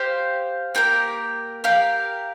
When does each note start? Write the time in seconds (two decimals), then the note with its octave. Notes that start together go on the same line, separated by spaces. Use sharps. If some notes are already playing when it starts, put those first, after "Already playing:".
Already playing: G4 C5 F5
0.75 A#3 G4 A#4
1.64 G4 A#4 F5